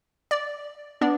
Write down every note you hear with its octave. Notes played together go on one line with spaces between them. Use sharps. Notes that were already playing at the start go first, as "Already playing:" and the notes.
D5
B3 D4 D5